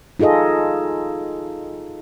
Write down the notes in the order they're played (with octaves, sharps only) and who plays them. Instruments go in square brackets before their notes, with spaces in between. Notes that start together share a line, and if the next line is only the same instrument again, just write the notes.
[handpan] D#4 F4 G#4 A4 D#5